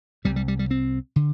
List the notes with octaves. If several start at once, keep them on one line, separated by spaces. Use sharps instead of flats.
C2 C3 G3
G3
G3
G3
C4
D3